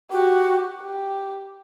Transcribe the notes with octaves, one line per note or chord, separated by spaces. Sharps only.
F#4 G4
G4